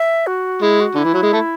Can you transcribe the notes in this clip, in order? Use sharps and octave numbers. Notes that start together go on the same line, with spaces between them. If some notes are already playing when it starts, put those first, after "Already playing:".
Already playing: E5
F#4
G#3 E4
F#4
D3 E4
E3
F#3
G#3
A3